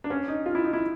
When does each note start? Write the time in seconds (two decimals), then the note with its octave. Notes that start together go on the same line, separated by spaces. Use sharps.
0.04 D4
0.10 C#4
0.28 D#4
0.46 F4
0.55 E4
0.64 D#4
0.73 E4